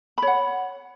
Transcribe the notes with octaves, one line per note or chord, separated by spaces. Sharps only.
C#5 F#5 B5